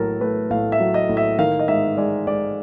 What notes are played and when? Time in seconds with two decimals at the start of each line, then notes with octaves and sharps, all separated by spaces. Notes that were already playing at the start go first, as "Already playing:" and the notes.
Already playing: A2 F#3 A4 A#4
0.21 A3 B4
0.50 A2 F5
0.72 E5
0.80 F#3
0.94 D#5
1.09 A2
1.17 E5
1.39 D#3 F5
1.59 D#5
1.68 G#2 E5
1.97 G#3 D5
2.27 G#2 D5